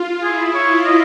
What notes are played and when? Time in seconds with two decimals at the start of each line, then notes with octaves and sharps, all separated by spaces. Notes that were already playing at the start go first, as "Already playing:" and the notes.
Already playing: F4
0.23 E4 G#4
0.54 F4 C#5
0.86 D#5